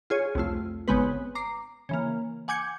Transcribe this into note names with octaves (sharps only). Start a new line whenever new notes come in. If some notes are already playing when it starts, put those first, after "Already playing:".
F4 G#4 C#5
C2 F2 A3 F4
G#1 C#3 G#3 B3 C4 B4
A#5 D6 C7
C#3 E3 A#3
F#5 G#5 D6 G6 G#6 C#7